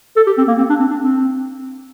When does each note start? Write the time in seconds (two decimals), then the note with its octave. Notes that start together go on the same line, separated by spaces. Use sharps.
0.16 A4
0.27 G4
0.38 C4
0.48 A#3
0.58 C4
0.69 D4
0.80 C4
0.90 D4
1.01 C4